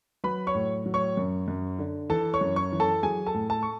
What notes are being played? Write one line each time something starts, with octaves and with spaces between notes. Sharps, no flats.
F#3 B4 B5
C#5 C#6
A2
F#3
C#5 C#6
F#2
F#2
D3
E3 A4 A5
C#5 C#6
F#2
C#5 C#6
E3
A4 A5
F#3 G#4 G#5
A4 A5
A2
A4 A5
C#6